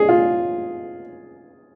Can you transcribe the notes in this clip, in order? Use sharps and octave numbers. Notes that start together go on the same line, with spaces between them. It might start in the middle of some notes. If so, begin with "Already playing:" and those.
Already playing: G#4
F4